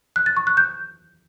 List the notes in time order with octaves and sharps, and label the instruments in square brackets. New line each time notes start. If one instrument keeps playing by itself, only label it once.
[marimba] F#6
A6
C#6
F#6
G6